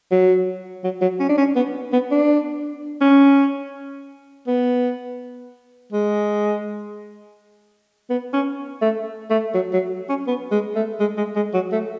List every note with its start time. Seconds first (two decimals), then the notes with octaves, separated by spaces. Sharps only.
0.11 F#3
0.84 F#3
1.02 F#3
1.20 C#4
1.29 D4
1.38 C#4
1.56 B3
1.93 B3
2.11 D4
3.01 C#4
4.47 B3
5.92 G#3
8.10 B3
8.33 C#4
8.82 A3
9.30 A3
9.55 F#3
9.73 F#3
10.09 C#4
10.27 B3
10.51 G#3
10.75 A3
11.00 G#3
11.18 G#3
11.36 G#3
11.54 F#3
11.72 A3